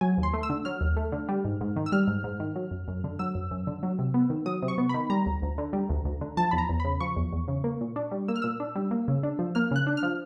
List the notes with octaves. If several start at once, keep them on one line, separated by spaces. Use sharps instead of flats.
F#3 G#5
D#2
C6
A3
E6
D3
F#3 F6
D#2
A3
D3
G3
G#2
G#2
D#3
E6
G3 F6
G#2
G#2
D#3
F#3
F#2
F#2
D3
F#3 E6
F#2
F#2
D3
F#3
C3
B3
D#3
F#3 D#6
C3
C#6
B3
D#3 B5
G3 A#5
D2
D2
D3
G3
D2
D2
D3
F3 A5
E2 B5
A#5
E2
C#3 B5
F3 C#6
E2
E2
C#3
A#3
A#2
D4
G3
A#3 E6
F6
A#2 E6
D4
G3
A#3
C#3
D4
F3
A#3 F6
C#3 F#6
D4
F6
F3